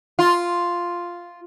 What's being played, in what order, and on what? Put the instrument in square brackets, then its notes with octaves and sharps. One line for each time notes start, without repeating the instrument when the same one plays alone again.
[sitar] F4